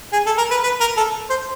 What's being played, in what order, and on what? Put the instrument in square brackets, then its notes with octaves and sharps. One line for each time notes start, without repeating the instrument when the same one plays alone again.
[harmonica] G#4
A4
A#4
B4
B4
A#4
A4
C5